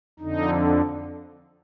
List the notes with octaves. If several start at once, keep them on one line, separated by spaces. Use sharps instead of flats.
F2 D3 D#4